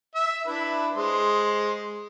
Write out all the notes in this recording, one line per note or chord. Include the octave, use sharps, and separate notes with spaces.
E5
D4 E4 B4
G#3 C5